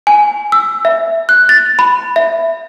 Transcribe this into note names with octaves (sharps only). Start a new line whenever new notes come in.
G#5
E6
E5
F#6
A6
B5
E5